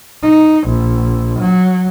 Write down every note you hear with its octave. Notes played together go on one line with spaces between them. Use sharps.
D#4
A#1
F#3